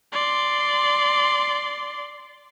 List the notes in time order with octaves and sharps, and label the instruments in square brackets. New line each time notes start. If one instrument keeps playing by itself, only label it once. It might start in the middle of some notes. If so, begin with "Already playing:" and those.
[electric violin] D5 C6